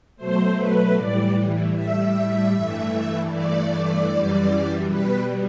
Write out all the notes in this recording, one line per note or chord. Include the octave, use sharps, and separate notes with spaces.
B2 F#3 A3 C5
B4
A2 E3 G3 D5
A2 G3 E5
G2 E3 A3
G2 E3 A3 D5
F#2 E3 G3
B2 G3 B4